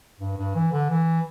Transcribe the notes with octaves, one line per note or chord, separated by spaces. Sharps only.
G2
G2
E3
D3
E3